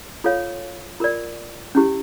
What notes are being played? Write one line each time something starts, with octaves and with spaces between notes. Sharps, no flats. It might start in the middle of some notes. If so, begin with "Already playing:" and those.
F4 A4 C#5 F5
F4 A#4 D5
C#4 E4 G4